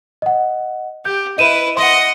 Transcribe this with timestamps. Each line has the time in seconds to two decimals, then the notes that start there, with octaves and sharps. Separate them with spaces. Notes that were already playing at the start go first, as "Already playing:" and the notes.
0.22 D#5 F#5
1.05 G4 G6
1.38 E4 B4 D#5 D#7 E7
1.77 D#5 F#5 C6